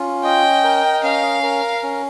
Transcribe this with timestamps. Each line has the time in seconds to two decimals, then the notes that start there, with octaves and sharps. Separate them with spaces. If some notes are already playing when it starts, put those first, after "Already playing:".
Already playing: C#4 F4
0.24 D#5 G5
0.64 A#4
1.03 C#4 F5
1.43 A#4
1.83 C#4